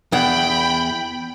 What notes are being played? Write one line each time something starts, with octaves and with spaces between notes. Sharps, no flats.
E2 F#5 G5 B5